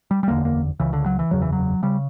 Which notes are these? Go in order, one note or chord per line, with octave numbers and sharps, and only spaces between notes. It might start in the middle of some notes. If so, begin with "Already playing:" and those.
G3
G3
F#1 E2 D3 A#3
A#3
C#2 C#3 E3
D3
F#3
E3
F#1 E2 C#3 F#3
E3
F#3
C#3 G3